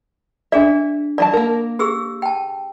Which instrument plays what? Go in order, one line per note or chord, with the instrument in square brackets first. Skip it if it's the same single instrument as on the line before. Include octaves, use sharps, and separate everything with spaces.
[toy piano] D4 G#4 D5 [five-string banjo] E5
[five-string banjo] E3 F#3 A5 [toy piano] D5
[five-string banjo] A#3 A#4
[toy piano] G4 G#4 E6
G5 A5